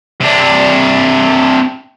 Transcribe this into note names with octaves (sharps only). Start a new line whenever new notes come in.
C3 D4